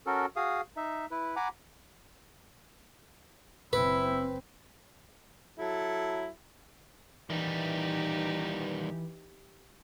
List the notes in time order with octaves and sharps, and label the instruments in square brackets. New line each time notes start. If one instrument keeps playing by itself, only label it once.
[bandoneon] C#4 F#4 A4 A#4
F#4 G#4 F5 D#6
D#4 E5
E4 B4
F#5 G#5 A#5 B5 D6
[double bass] F#1 C4 [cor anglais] E4 [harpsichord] B4
[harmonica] F#3 E4 A4
[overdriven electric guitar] D#3 G3 [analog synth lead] E3 [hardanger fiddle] D#4 G4